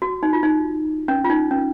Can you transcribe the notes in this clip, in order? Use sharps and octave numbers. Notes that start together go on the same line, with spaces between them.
F#4
D#4
F4
D#4
C#4
F4
D#4
C#4